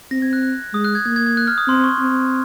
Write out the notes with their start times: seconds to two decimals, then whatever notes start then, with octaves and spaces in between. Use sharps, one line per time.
0.11 C4 A#6
0.22 G#6
0.33 F#6
0.43 F#6
0.74 G#3 D#6
0.84 F#6
0.95 G#6
1.05 A#3 G#6
1.16 G#6
1.26 G#6
1.37 F#6
1.47 F6
1.58 D#6
1.68 C4 C6
1.84 C#6
1.99 C4